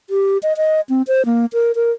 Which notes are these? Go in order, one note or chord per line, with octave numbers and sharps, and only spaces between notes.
G4
D#5
D#5
C4
C5
A#3
A#4
A#4